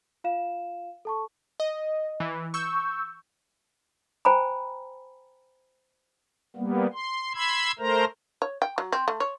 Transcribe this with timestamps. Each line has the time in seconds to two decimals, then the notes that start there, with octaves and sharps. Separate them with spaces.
0.24 F4 F5 E7
1.05 A4 A5 C#6
1.60 D#5
2.20 E3
2.54 C#6 E6 G6
4.25 C5 G5 G#5 A#5 B5
6.56 G3 A#3 B3
6.93 C6
7.35 B5 C6 E6 G#6
7.79 A3 A#4 C5 A#5
8.42 C#5
8.62 G5
8.78 F#3
8.92 C4
9.08 A3
9.20 C#5